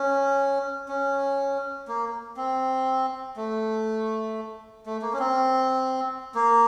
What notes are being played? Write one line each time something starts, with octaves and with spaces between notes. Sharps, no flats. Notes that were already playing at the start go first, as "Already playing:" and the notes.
Already playing: C#4
C#4
A#3
C4
A3
A3
A#3
C#4
C4
A#3